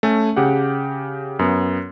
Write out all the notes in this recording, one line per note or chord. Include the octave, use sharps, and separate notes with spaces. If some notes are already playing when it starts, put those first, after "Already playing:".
A3 C#4 A4 G#5
C#3 G4 F#5
F#2 B3